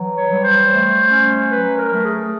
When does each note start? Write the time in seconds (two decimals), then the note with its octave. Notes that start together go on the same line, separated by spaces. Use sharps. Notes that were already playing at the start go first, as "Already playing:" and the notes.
Already playing: E3 F#3
0.17 C#5
0.30 G3
0.43 C5
0.70 A3
1.10 C#4
1.51 F#3 B4
1.77 A#4
1.91 A3
2.04 G#4